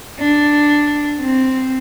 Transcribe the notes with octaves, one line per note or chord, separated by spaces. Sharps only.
D4
C4